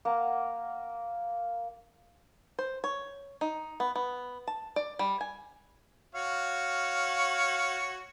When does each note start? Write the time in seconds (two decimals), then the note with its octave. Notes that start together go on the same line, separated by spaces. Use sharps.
0.05 A#3 F#5 A#5
2.59 C5
2.84 C#5
3.41 D#4
3.80 B3
3.96 B3
4.47 A5
4.76 D5
4.99 G3
5.21 G#5
6.15 F#4 C#5 F5